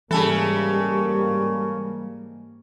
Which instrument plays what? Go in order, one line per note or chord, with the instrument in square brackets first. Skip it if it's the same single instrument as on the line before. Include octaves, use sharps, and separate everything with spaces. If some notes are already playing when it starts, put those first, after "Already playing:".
[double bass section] G#2 A#3 [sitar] C#3 A4 [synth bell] E3 G#5 [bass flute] G3